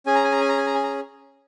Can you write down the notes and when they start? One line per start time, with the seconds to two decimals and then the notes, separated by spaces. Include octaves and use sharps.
0.06 C#4 G#4 G#5
0.15 A#5
0.24 G#5
0.32 A#5
0.41 G#5
0.49 A#5
0.57 G#5
0.66 A#5
0.75 G#5
0.83 A#5